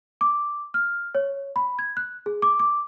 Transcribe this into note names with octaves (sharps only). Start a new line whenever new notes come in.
D6
F6
C#5
B5
G#6
F#6
G#4
D6
D6